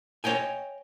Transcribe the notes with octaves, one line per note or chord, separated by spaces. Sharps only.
C#5 D#5 G5 G#5